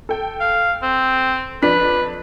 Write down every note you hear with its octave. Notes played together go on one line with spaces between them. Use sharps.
A4 G5
F5
C4
F2 D4 B4 B6